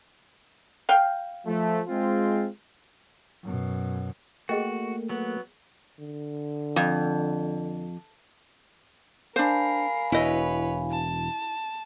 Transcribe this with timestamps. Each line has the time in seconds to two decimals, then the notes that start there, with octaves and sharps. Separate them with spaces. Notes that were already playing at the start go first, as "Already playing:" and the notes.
0.89 F5 G5
1.46 F3 A3
1.88 G#3 C4 F4
3.43 F#2 B2
4.49 A3 A#3 F#4 G#4 D#5 G5
5.09 F#3 B3
5.99 D3
6.76 F2
9.36 D4 A#4 C5 F5 G#5 B5 C7
10.12 E1 E4 B4 C#5 D#5
10.91 A5